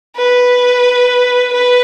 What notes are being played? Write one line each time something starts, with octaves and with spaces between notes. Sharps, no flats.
B4
B4